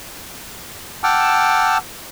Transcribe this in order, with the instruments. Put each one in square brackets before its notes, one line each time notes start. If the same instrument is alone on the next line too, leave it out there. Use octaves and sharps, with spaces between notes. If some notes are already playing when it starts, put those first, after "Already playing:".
[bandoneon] F#5 G5 A5 D6 E6 F6